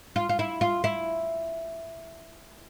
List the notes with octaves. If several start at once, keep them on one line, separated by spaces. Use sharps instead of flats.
F4
F4
E4
F4
E4